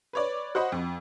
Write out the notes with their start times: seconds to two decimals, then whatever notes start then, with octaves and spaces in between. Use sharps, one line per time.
0.13 B4 C#5 D5
0.55 F#4 C5 D#5 F#5 B5
0.72 F2